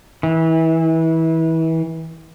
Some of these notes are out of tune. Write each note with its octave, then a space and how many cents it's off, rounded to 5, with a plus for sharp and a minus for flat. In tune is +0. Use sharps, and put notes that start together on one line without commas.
E3 -25